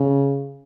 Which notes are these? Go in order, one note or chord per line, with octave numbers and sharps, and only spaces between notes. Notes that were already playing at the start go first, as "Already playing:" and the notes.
Already playing: C#3